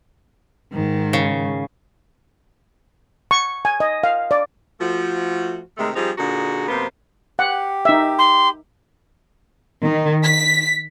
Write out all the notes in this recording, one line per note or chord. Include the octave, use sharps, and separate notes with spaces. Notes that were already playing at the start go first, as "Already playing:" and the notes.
G#2 D#3
C#3
C#6
G#5
D#5
F5
D5
F3 A3 F#4
C3 D#3 G#3 A3
F3 G3 C4 D#4 G4 G#4
A#2 D3 D#4 F#4 G#4
F#2 C3 A#3 B3 C5
G4 F#5
D#4 E5
C6
D#3
B6